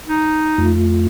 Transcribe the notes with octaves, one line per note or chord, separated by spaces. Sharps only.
D#4
F2 A3 F4